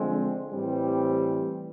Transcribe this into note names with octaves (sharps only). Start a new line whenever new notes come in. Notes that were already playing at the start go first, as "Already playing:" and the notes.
Already playing: D3 F3 G#3 C4
A2 E3 G3 C4